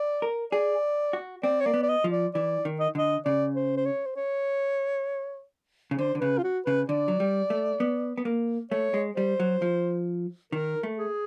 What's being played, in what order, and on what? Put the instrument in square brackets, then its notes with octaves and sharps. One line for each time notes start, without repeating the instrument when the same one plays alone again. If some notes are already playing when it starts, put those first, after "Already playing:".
Already playing: [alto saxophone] D5
[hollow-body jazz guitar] A#4
[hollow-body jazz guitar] G#4 [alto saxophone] D5
[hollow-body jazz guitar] F#4
[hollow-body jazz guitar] C4 [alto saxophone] D5
[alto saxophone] C#5
[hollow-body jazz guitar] A#3 [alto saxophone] D5
[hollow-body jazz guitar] B3
[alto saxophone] D5
D#5
[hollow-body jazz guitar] F3
[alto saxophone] D5
[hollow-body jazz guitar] E3 [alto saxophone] D5
[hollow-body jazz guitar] D#3
[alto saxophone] D#5
[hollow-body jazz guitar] D3 [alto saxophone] D#5
[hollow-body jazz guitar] C#3 [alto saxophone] D5
[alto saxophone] C5
C5
C#5
C5
C#5
[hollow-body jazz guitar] C#3
[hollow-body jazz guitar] D3 [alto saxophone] C5
[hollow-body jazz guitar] D3
[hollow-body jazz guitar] C#3 [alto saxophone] B4
[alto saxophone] F4
F#4
[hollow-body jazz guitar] C#3 [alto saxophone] B4
[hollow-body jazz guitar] D3 [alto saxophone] D5
[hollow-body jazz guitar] F#3
G3
A3
B3
B3
A#3
[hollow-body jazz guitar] A3 [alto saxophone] C#5
[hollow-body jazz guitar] G#3
[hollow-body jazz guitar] G3 [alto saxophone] C5
[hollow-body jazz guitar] F#3
F3
[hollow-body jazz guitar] D#3 [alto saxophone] A#4
[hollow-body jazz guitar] A3
[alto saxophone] G#4